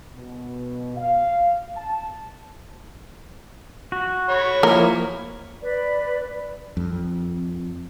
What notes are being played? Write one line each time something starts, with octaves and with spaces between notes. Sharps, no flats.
B2
F5
A5
F#4
C#5 B5 C#6
F3 A#3 E4 A#4
B4 D5
F2